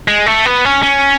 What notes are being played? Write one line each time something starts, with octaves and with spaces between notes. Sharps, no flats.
G#3
A3
B3
C#4
C#4